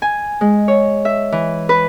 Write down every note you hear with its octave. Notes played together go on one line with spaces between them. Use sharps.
G#5
G#3
C#5
E5
E3
B4